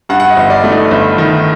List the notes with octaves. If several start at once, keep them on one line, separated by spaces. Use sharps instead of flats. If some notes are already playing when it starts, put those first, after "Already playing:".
G2 F#5
F#5
D#5
G1
D5
A3
D#4
G1
D#3